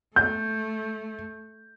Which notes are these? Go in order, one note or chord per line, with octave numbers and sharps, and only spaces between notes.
A3 G6